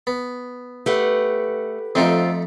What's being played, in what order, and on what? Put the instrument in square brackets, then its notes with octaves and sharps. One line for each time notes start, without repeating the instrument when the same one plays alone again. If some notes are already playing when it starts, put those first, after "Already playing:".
[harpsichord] B3
[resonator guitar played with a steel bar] A3 [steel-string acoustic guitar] G4 B4 F#5
[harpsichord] F2 A3 D#4 [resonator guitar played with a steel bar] C4 F4